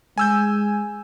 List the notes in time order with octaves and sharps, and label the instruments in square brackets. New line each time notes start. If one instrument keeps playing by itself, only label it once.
[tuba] G#3 [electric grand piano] G#5 E6 G6